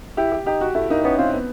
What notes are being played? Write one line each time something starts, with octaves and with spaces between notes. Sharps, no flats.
E4 G4
G4
D#4 G4
F#4
A3 E4
A#3 D#4
B3 C#4
C4 F4
B3